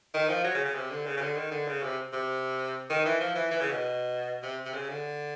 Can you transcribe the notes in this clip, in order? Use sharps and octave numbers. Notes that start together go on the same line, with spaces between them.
D#3
F3
F#3
C#3
C#3
C3
D3
C#3
C#3
D3
D#3
D3
C#3
C3
C3
D#3
E3
F3
E3
E3
C#3
B2
C3
C3
C#3
D3